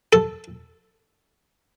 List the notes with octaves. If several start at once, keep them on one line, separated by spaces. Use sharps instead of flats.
A4